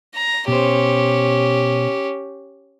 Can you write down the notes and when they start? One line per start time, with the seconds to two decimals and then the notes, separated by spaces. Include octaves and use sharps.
0.15 A#5
0.48 B2 C#4 G4 C5